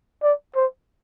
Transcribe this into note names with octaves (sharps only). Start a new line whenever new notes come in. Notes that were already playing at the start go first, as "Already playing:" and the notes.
D5
C5